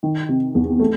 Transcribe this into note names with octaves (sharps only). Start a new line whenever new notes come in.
D#3
C3
E2
A3